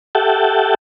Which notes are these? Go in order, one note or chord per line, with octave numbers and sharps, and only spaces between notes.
G4 A4 E5 F#5 G5 A5